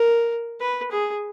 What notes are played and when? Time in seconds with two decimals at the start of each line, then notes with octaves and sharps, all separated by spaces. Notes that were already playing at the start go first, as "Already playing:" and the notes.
Already playing: A#4
0.60 B4
0.91 G#4